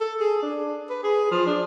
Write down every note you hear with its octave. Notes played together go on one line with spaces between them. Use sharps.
A4
G#4
D4
B4
G#4
F3
D4